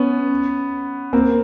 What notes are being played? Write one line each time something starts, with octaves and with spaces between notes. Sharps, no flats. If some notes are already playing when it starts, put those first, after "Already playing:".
Already playing: B3 C#4
A#3 C4